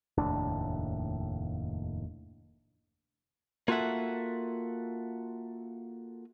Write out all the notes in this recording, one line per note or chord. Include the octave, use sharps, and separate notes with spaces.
F1 D#2 A2 D4
A#3 F4 F#4 A4 E5 F#5